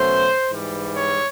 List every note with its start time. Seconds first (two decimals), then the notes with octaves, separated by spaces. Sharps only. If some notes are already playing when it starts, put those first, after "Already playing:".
Already playing: B2 F#3 A3 C#4 C5
0.50 G#2 E3 G3
0.96 C#5